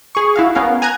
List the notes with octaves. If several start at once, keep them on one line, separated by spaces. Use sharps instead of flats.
G#4 C#6
E4 F#4 F5
B3 C#4 A#4 F5
G#5 A#5 F#6 G#6